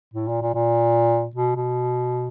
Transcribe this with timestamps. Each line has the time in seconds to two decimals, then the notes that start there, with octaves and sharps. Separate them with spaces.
0.14 A2
0.28 A#2
0.42 A#2
0.54 A#2
1.36 B2
1.56 B2